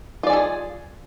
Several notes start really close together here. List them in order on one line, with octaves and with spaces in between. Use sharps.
F4 D5 G#5 A4 G#4